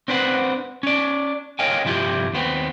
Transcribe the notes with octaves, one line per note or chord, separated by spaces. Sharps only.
C4 D4 B4 C5 F#5
C#4 D5
A#4 C#5 D#5 F5 G5 G#5
C2 G2 F3 E4 F4 G4
D#2 B3 C4